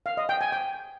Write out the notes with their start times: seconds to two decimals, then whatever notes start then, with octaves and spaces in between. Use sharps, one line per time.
0.06 F5
0.17 D#5
0.29 G5
0.41 G#5
0.52 G5